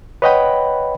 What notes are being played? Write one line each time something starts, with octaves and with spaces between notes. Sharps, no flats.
B4 C#5 D#5 F#5 G5 B5